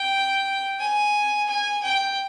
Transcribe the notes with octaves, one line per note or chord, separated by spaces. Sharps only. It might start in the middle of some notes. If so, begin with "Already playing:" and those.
Already playing: G5
G#5
G#5
G5